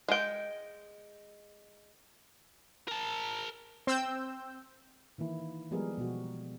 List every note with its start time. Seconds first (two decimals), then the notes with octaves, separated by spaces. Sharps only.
0.08 G#3 G5
2.88 A#4 A5
3.87 C4 E6 G6
5.18 D#3 E3 A#3 E4
5.71 F3 G3 G#3 B3 G#4 A#4
5.98 B2 F#4